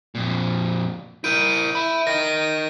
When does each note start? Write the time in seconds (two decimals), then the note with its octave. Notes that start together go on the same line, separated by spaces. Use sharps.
0.15 F2 A#2
1.24 E4 A#4 G6 D7 D#7
1.75 E5 B5
2.07 A#4 D#5 A#6
2.25 A#6